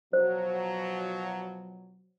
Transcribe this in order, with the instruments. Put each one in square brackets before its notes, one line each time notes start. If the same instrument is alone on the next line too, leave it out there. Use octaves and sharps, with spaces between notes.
[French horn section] B2 F3 F#3 [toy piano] C5